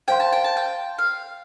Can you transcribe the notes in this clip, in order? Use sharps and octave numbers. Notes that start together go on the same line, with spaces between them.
C5 F5 G5 C6
A5
G5
A5
G5
F5